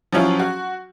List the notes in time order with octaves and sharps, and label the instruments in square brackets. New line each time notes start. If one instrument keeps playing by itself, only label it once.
[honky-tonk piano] F3 F#3 C#4 E4 F4
F#4